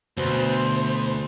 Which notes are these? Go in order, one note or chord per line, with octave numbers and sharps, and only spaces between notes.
D2 B2 C5